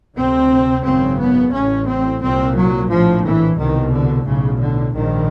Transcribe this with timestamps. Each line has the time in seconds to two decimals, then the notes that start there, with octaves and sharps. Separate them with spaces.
0.16 D2 C3 C4
0.84 G#1 F#2 C#3 C4
1.19 B3
1.53 A1 A2 C#4
1.87 C4
2.22 C2 A#2 C4
2.56 F#3
2.90 A#1 A2 F3
3.24 E3
3.57 C2 B2 D#3
3.93 D3
4.26 B1 A2 C#3
4.60 D3
4.94 A#1 G#2 D#3